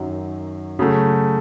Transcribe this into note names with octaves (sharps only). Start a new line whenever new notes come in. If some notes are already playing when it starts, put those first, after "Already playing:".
Already playing: F#2 D#3 F#3
C#3 F#3 A3